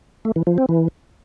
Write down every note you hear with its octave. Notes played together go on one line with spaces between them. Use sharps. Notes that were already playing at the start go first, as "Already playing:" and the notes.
A3
E3
F3
C4
E3